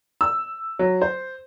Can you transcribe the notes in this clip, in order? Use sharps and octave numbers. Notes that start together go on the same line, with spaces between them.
E6
F#3
C5